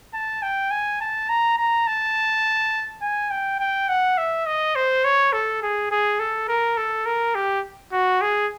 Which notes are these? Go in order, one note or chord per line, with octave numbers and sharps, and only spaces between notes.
A5
G5
G#5
A5
A#5
A#5
A5
G#5
G5
G5
F#5
E5
D#5
C5
C#5
A4
G#4
G#4
A4
A#4
A4
A#4
G4
F#4
G#4